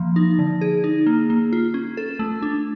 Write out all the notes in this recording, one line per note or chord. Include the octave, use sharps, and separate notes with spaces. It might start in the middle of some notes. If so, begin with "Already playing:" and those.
Already playing: E3 F3 A#3
D#4
D3
G#4
D#4
A#3
A#3
F4
C#4
A4
A3
D4